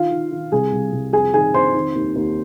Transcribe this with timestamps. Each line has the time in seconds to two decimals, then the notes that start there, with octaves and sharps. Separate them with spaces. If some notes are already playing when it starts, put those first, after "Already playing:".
Already playing: D#3 F4 F5
0.11 D#3
0.32 D#3
0.52 C2 G#4 G#5
0.72 C2
0.92 C2
1.13 F2 G#4 G#5
1.34 D#3 G#4 G#5
1.54 F2 C5 C6
1.74 D#3
1.95 D#2
2.16 D#2